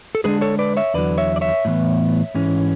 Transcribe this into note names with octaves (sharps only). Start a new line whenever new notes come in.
A4
D3 G#3 D4 G#4 B4
A4 C#5
B4 D5
C#5 E5
E2 D3 F#3 B4 D5
C#5 E5
D5
C#5 E5
A2 E3 B3
G#2 E3 G#3 C#4